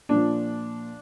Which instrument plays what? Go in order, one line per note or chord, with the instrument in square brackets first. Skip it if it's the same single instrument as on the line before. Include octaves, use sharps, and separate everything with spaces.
[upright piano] A#2 F3 D4